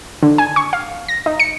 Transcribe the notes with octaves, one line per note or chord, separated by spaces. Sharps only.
D3
G#5
C#6
F5
A#6
D#4
C#7